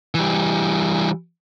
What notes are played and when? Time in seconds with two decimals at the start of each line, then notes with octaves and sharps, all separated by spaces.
0.15 E3 G3